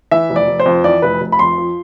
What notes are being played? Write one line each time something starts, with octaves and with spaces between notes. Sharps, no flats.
E3 E5
F1
D5
F1
C5
F2
E3 D5
F1 B4
F1
B5
F2 C6
F3